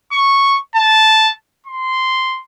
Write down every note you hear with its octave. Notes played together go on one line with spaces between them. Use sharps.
C#6
A5
C6